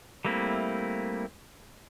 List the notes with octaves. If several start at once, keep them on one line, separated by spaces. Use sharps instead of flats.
G3 A3 A#3 C4 E4